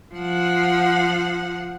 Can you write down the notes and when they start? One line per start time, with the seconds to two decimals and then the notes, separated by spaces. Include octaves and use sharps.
0.15 F3 F#5